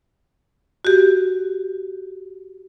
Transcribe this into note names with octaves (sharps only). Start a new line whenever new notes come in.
F#4 G4